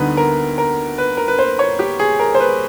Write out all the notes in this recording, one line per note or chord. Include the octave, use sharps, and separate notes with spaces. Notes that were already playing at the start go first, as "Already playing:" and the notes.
Already playing: D2 D3 G3 B3 D#4 B4
A#4
A#4
B4
A#4
B4
C5
C#5
G4
G#4
A#4
C5
B4